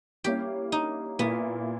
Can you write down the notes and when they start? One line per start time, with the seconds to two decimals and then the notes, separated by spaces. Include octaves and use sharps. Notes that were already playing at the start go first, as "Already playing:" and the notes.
0.24 G3 A#3 C#4 E4 G4
0.72 D#4
1.19 A#2 A#3 B3 E4